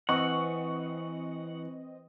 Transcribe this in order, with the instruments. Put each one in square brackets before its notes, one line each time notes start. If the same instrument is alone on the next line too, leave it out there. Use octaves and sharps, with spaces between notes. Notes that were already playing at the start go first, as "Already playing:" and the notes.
[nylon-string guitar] E3 [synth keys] C4 D#5 [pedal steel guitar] F#5 [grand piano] C#6